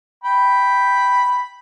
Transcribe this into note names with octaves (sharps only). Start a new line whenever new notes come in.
G5 B5